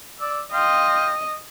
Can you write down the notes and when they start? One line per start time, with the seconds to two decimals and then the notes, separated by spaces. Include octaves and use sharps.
0.20 D5 E6
0.53 D#5 F5 G5 C6